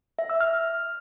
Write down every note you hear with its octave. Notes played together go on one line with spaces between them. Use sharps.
E5
E6
F6